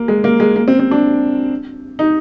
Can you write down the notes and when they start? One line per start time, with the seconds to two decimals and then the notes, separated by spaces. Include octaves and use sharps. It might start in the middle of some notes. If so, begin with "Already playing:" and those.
Already playing: A#3
0.08 G#3
0.24 A#3
0.40 G#3
0.56 A#3
0.68 C4
0.80 C4
0.91 D4
1.99 D#4